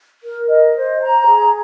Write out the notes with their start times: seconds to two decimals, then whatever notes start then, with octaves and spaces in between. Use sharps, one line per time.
0.23 A#4
0.49 D#5
0.76 C5
1.02 A#5
1.28 G#4